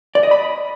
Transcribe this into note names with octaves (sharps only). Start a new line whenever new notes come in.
D5
D#5
B5